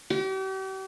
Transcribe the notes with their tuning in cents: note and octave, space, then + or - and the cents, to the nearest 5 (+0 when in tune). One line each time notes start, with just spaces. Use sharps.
G4 -40